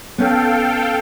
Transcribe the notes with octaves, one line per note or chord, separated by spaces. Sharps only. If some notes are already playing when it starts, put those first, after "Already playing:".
B3 C#4 A4 F5 G5